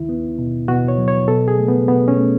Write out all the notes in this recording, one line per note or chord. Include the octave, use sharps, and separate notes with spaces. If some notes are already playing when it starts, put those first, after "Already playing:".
Already playing: D#2 D#3 E4
B3
B2
B2 F#4
C#5
F#3
C#5
B2 A4
G#4
A3
B3
B2 B3
C#4
A3